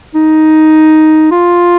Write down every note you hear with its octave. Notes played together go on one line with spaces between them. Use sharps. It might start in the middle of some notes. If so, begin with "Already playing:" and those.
D#4
F4